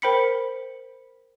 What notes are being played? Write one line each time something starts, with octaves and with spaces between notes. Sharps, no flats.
A#4 C5 G5 B5 B6 C#7